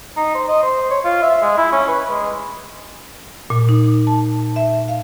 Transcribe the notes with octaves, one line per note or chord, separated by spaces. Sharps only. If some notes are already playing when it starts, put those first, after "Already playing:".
D#4
C5
D#5
C5
C#5
F4
E5
G#3
E4
C#4
B4
G#3
A#2
D#4
A5
E5
F5